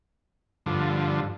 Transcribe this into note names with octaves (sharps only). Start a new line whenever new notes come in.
G2 D3 F3